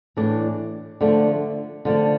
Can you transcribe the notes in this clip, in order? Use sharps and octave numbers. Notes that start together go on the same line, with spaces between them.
A2 E3 A3 D4
D3 F3 A3 D4
D3 F3 A3 D4